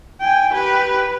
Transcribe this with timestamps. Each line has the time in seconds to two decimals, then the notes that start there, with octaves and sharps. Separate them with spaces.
0.20 G5 G#5
0.54 G4 B4